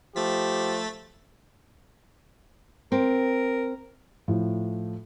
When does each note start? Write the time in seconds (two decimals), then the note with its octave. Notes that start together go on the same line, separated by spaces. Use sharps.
0.16 F3 A3 G4 A6 B6
2.92 C4 A#4
4.28 A2 F3